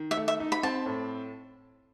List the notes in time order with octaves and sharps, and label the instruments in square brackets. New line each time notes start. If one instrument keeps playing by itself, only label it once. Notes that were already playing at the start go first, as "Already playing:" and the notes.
Already playing: [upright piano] D#3
[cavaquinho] E5
[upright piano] A3
[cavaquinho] E5
[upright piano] D#4
[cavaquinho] B5
[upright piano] C4 [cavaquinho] A5
[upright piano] A2